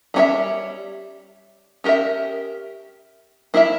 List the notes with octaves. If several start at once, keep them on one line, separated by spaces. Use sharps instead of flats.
G3 C#4 G#4 C#5 E5
C#4 G4 A#4 E5
A#3 E4 A#4 E5